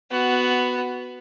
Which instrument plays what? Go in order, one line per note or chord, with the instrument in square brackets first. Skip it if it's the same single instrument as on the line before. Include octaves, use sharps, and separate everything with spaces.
[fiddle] B3 F#4